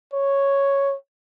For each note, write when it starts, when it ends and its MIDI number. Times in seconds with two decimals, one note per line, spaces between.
0.14 0.95 73